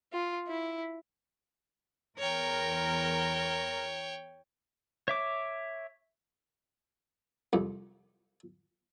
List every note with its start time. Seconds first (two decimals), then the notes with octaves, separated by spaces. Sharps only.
0.13 F4
0.48 E4
2.19 E2 A#4 C#5 G5
5.08 C#5 E5 D6
7.53 C2 F2